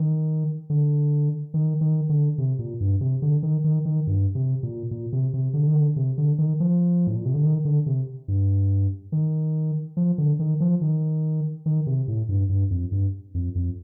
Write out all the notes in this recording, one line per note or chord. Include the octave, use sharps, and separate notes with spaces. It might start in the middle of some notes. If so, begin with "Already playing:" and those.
Already playing: D#3
D3
D#3
D#3
D3
C3
A#2
G2
C3
D3
D#3
D#3
D#3
G2
C3
A#2
A#2
C3
C3
D3
D#3
D3
C3
D3
D#3
F3
A2
A#2
C3
D3
D#3
D3
C3
G2
D#3
F3
D3
D#3
F3
D#3
D#3
C3
A2
G2
G2
F2
G2
F2
F2